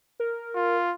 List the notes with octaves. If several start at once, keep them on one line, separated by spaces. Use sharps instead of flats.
A#4
F4